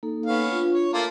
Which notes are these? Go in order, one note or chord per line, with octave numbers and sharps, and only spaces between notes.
A#3 D#4 A4
B3 C#4 F5
D4 F4
C#5
A3 A#3 F4 A5